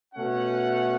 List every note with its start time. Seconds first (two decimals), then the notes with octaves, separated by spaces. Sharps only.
0.14 B2 A3 C#4 F#5